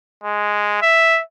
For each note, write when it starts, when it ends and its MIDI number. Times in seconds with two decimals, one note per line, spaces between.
0.24 0.79 56
0.82 1.21 76